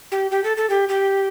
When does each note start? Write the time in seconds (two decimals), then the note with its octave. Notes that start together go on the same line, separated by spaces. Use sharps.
0.12 G4
0.31 G4
0.44 A4
0.57 A4
0.70 G4
0.89 G4